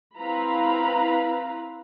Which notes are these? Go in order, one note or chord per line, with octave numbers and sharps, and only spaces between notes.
C4 E4 B4 F5 A#5 B5